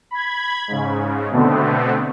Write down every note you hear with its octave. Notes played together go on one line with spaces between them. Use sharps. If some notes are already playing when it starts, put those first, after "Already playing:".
B5 G#6
G#2 C#3
B2 D3 A3 B3 C4